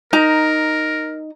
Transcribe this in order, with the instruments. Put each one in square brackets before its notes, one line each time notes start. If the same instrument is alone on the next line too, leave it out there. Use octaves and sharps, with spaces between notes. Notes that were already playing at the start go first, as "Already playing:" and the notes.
[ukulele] D#4 A#5 [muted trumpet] A#4